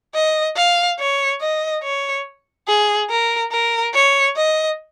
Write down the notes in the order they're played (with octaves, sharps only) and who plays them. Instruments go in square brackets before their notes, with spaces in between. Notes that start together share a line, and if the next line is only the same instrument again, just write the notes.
[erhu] D#5
F5
C#5
D#5
C#5
G#4
A#4
A#4
C#5
D#5